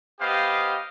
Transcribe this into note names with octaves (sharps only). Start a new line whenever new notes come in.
B3 G4 C5 D#5 F5